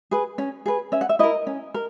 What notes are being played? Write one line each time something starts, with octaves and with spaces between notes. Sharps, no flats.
G#4 B4
C#4
G#4 B4
C#4 E5
F#5
E5
E4 A#4 D#5
C#4
A#4